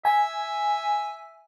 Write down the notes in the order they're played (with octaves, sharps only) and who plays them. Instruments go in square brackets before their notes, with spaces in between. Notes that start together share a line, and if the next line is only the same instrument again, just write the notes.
[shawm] E5 [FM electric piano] G#5